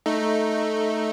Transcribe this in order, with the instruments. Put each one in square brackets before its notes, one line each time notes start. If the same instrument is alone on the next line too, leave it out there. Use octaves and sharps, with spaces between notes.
[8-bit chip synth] A3 D#4